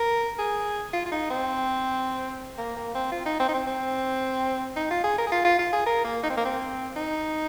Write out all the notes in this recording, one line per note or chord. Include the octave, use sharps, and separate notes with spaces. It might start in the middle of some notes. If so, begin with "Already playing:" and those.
Already playing: A#4
G#4
F4
F4
D#4
C4
A#3
A#3
C4
F4
D#4
C4
D#4
C4
C4
D#4
F4
G#4
A#4
G#4
F4
F4
F4
G#4
A#4
A#3
D#4
C4
A#3
C4
D#4